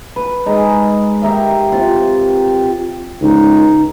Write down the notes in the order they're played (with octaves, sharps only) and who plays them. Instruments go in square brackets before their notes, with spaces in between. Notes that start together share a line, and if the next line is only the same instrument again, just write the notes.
[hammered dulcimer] B4
G#3 D#4
G4 A#4 E5 F5
C3 F4
[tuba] C#2 [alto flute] D#4